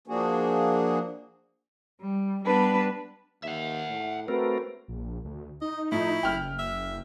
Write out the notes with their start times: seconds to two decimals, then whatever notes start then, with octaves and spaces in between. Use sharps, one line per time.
0.07 F3 A#3 D4 F#4 G#4
2.01 G3
2.45 G3 B3 D4 B4
3.43 D#2 E5 F#5
3.89 A2
4.28 A3 C4 F#4 A#4 B4
4.88 A#1
5.25 D2
5.62 D#4 D#5
5.92 A2 F3 E4
6.23 F#1 G5 F6
6.59 E5